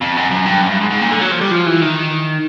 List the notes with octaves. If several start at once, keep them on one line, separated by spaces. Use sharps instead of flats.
F2
F#2
F#2
G2
F#2
G2
G#2
G#2
A#2
D3
F#3
F3
G3
F3
E3
D#3